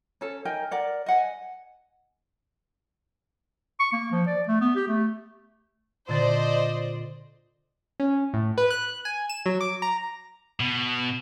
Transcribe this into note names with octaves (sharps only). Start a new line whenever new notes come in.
C#4 A4
D#4 A#4 G5 G#5
A#4 D5 F#5
D#5 F#5 G#5
C#6
A#3
F3
D5
A3
B3
G4
A3
A#2 D3 C5 D5 D#5 A6
C#4
A2
B4
F#6
G#5
E7
F#3
D6
A#5
B2